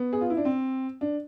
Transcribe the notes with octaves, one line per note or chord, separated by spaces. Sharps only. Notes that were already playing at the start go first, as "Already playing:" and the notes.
Already playing: B3
G#4
F4
E4
D4
C4
D4